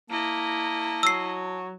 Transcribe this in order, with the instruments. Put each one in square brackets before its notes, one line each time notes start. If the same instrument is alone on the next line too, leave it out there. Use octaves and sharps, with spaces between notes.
[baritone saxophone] A#3 [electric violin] E4 D#5 [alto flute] A5
[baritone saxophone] F#3 [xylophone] E6 C7